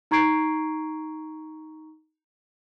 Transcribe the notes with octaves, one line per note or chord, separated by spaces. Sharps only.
D#4 A#5 C#6 G#6 C7 D7